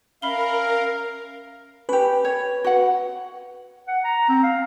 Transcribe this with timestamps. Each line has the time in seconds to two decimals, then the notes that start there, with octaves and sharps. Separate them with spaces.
0.22 C#4 A#4 E5 F5 B5 G7
1.89 C#4 G4 B4
2.25 C#5
2.64 F#4 F#5
3.88 F#5
4.04 A#5
4.29 C4
4.43 F5